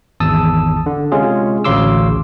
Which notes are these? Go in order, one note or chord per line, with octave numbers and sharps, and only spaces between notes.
G#1 E2 A5 D#6 E6
D3
C3 G#3 C#4 F4 G#4
A1 D2 C#3 C6 D6 E6